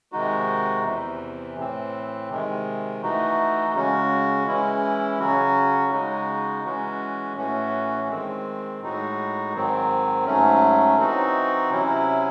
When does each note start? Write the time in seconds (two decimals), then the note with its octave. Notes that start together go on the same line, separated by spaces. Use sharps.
0.12 C3 D#3 G#3 D#4 F#4
0.84 E2 C3 E3
1.57 A2 E3 C4
2.30 C3 D#3 G#3
3.02 E3 A3 D#4 F#4
3.74 C#3 G#3 C#4 F#4
4.47 E3 G#3 C#4 E4
5.19 C#3 F#3 C#4 F#4
5.91 C#3 G#3 D#4 F#4
6.64 E3 G#3 C#4 F#4
7.36 A2 E3 A3 C#4 F#4
8.08 D#3 G#3 C4
8.80 A2 G#3 D#4 F#4
9.53 G#2 D#3 F#3 C4
10.26 G#2 F#3 A3 C#4
10.98 E3 C4 D#4 F#4
11.70 C3 F#3 C#4 E4